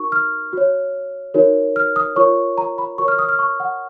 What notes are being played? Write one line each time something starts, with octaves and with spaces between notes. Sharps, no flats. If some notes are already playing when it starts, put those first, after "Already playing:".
Already playing: D#4 F#4 A#4 C#6
F6
F#4 C#5
D#4 F#4 A#4 C#5
F6
D#6
F4 A#4 C#5 C#6
A#5
B5
F#4 A#4 C#5 C#6
F6
D#6
F6
C#6
F#5